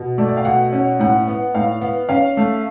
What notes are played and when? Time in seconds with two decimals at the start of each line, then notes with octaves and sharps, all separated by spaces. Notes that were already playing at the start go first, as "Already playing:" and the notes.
Already playing: B2
0.18 A3 D5
0.28 D5
0.37 F5
0.45 B2 F#5
0.73 C#4
1.00 A2 F#5
1.27 B3
1.55 A2 F5
1.81 B3
2.09 C#4 F5
2.37 A3